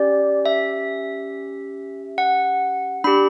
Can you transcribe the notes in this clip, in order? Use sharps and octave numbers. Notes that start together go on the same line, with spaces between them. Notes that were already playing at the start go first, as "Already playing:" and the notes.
Already playing: C#4 G4 D5
E5
F#5
D4 G4 B5